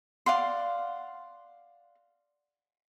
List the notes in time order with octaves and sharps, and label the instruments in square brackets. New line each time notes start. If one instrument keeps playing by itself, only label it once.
[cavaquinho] D5 F5 F#5 C6